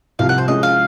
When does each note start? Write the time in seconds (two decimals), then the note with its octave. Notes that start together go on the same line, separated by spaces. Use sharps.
0.19 C2 C3 F3 F5
0.29 F#5
0.38 C5
0.48 F3 G#3 C#4 G#4 D#5
0.63 F5